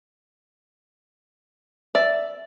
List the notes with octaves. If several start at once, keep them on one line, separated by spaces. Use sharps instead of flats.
D5 E5